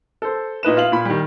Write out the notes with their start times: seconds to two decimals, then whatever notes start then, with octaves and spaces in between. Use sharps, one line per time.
0.22 A4 C5
0.63 A#2 D#4 B4 E7
0.77 F4 F5 F#7
0.92 A#2 B5
1.05 D#3 G3